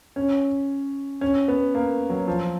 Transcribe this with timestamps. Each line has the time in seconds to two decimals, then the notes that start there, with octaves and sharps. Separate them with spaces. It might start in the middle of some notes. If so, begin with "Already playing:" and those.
0.16 C#4
1.21 C#4
1.48 B3
1.75 A#3
2.10 F#3
2.28 F3